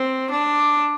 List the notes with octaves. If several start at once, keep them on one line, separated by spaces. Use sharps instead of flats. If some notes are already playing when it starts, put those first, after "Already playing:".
Already playing: C4
D4